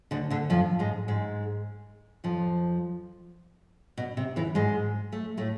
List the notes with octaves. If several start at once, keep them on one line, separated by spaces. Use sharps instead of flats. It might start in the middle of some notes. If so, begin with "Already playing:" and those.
D2 D3
D2 D3
F2 F3
G#2 G#3
G#2 G#3
F2 F3
B2
C3
E2 E3
G#2 G#3
A3
A2 A3